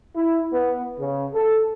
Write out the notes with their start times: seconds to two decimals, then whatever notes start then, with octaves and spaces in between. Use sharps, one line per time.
0.15 E4
0.53 B3
0.99 C#3
1.34 A4